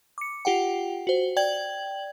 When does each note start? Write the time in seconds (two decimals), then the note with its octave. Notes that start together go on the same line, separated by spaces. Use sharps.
0.18 D6 C#7
0.45 F4 G4 F#5 G5
1.07 F#4 C5
1.36 D5 G5 G#6 F#7